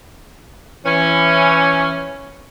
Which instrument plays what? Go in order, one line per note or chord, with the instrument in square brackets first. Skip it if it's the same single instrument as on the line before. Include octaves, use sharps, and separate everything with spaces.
[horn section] E3 C#4